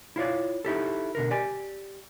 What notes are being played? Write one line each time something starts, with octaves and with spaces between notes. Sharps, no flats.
E4 F4 C#5 D5
D#4 E4 G4 A4
B2 D3 A#4
G4 D5 G#5